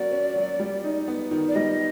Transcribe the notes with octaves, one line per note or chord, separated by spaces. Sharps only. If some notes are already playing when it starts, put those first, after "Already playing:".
Already playing: F#3 A#3 C#4 F#4 D5
C#4
F#3
G3
D#4
B3
D#3
D5
G3 D#5